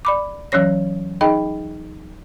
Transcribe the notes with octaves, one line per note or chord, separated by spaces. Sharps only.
D5 B5 D6
E3 F#3 C#4 C#5 A#6
D#4 G#4 D#5 G5 B5